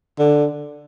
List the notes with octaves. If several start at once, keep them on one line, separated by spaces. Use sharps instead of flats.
D3